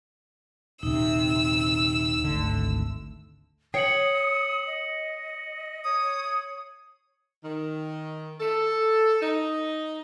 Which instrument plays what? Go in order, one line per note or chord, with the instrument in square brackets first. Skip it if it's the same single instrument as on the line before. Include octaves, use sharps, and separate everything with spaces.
[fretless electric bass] D#1 C3 [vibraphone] D#4 [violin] E6
[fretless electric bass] G#1 D2 D3
[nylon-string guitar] C#5 G5 [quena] D#6 [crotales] C7 C#7 F#7
[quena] D#5
[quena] C#5 [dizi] D#6
[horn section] D#3
A4
D#4